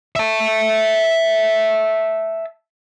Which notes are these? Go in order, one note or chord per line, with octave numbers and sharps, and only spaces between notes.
E5 A5